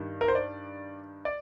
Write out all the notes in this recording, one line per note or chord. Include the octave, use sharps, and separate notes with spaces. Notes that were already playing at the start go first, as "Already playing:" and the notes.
Already playing: G2 D#3 G3
A#4
C5
D5
D5